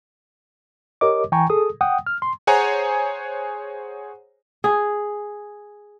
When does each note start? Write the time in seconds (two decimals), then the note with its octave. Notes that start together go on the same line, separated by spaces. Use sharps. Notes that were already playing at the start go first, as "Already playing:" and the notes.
1.01 G4 A#4 C#5 D#5 D6
1.32 E3 G5 G#5 A#5 C#6
1.50 G#4 A4 D#6
1.81 F#5 G5 D#6
2.07 F6
2.22 C6
2.47 G#4 C5 C#5 F#5 G#5 A#5
4.64 G#4